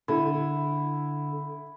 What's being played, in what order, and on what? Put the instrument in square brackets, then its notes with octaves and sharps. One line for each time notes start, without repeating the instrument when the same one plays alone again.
[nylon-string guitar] D3 A4 [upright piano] E4